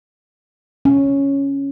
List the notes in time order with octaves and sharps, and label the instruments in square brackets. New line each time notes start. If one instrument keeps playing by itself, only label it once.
[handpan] C#4